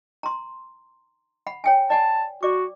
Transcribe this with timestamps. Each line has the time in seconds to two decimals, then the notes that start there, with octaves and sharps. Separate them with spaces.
0.23 A#5 C6
1.47 F#5 B5
1.64 C#5 G5 G#5
1.90 D5 F#5 G#5 A5
2.43 F#4 D5 D6